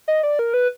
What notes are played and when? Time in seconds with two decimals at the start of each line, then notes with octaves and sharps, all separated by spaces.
0.08 D#5
0.23 D5
0.39 A#4
0.54 B4